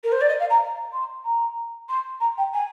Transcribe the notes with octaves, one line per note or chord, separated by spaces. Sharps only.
A#4
C5
D5
D#5
F5
A#5
C6
A#5
C6
A#5
G5
G#5